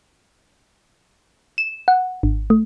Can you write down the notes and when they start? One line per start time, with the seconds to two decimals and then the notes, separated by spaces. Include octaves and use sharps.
1.58 E7
1.88 F#5
2.23 G#1
2.50 A3